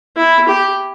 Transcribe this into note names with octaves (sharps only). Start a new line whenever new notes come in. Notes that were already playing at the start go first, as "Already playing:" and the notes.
E4
G4